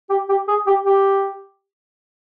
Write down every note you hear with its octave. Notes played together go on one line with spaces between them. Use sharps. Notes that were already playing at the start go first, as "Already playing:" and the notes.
G4
G4
G#4
G4
G4